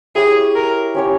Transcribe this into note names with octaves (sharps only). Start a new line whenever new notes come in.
E4 G4 G#4 C#5
A#4
C#4 G4 C#5